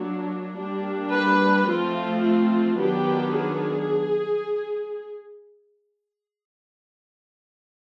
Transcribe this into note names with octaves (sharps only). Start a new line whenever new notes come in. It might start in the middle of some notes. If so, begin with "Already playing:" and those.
Already playing: F#3 A#3 D4
G3 A#3 D4
B4
F3 A3 C4 F4
F4
D#3 F#3 B3 D4 G4
G#4